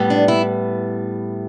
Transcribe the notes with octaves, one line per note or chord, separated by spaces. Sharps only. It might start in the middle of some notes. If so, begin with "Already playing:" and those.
Already playing: A2 G3 B3
D4
E4